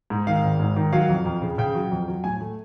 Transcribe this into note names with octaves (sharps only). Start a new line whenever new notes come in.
G#2
D#3 F5
G#1
G#2
D#3
F#3 F5
F2
F2
C#3
C#3 G5
F#3
F2
F#3
A2 G#5
A3